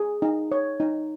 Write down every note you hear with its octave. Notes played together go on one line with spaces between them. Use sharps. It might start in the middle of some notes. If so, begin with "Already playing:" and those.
Already playing: G#4
D#4
C#5
D#4